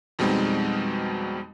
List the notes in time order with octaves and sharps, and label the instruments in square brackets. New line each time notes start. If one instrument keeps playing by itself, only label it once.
[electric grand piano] F2 B2 G3 G#3 C4 D#4